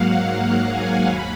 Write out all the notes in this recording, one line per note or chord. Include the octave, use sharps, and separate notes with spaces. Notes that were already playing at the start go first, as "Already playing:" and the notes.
Already playing: G#2 F#3 A#3 F5 F#5
F#5
G#5
D#2 B5